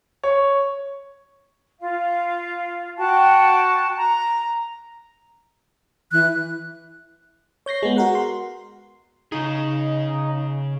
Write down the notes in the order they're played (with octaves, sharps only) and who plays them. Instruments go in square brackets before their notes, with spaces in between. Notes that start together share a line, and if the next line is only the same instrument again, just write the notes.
[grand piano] C#5
[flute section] F4 F5
F#4 G5 A5 F#6
A#5
[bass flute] E3 [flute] F#6
[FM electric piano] C#5 G6 A#6 C7
G#3 B3
F#4 A#4 F#5
C6
[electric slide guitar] C#3 G#4 [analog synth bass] D#4